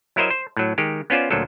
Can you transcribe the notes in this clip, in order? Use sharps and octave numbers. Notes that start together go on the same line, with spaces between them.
F#3 E4 A#4 C5 D#5 E5
C5
A2 F#3
D#3 G#3 G4
B3 C#4 F4 C5 D5
D2 A#2 F3 F#3 A4